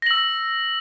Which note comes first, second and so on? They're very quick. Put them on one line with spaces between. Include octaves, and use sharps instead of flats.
A#6 F#7 E6